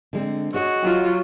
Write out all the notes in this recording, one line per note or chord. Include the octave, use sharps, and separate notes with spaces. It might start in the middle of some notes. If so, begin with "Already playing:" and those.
D3 G#3 C4
F#4 G#4 C#5 D#5
F#3 F4